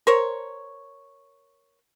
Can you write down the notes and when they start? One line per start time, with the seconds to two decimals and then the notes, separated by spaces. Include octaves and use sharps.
0.07 A#4 C5 C#5